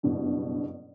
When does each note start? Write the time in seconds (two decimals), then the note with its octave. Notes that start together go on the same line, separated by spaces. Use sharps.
0.03 F#1 G2 B2